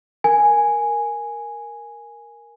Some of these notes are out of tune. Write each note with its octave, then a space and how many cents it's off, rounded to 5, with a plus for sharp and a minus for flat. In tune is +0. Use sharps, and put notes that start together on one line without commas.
A#4 +0 G#5 +0